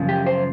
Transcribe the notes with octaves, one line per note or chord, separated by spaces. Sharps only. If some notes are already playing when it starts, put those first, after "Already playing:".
Already playing: F#2 C#3 F3
G4
C5